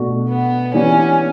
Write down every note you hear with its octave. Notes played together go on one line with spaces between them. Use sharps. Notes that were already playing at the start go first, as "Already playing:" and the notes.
Already playing: B2 A3 D4 F#4
B3
E3 B3 C#4 D4 G4